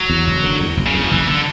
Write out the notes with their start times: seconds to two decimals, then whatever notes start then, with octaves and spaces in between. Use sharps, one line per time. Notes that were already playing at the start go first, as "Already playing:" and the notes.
Already playing: F#3
0.09 E2
0.27 F#1
0.44 D3
0.60 E2
0.77 F#1
0.86 C#3
0.94 E2
1.03 F#3
1.11 F#1 E3
1.28 D3